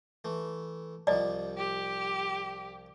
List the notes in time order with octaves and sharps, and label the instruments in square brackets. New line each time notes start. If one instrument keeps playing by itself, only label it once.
[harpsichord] E3 A3
[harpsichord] C2 F3 G3 [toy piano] D5 D#5
[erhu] G4